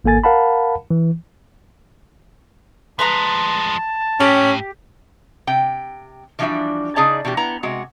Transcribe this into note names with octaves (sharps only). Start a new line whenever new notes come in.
G#1 A#3 A4 G#5 A6
A#4 F5 F#5 A5 B5
E3
F3 G#3 B4 A5 A#5 C6
A2 C#4 G4
C3 G5
E3 F3 G3 D4 F#4 E5
C#3 D#4 G#4 D5 D#5 A5
B2 E3 D4 G4
B3 E4 A#5
C3 G#3 F#4